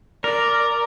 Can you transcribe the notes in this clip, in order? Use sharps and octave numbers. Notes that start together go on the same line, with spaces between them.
A#4 D5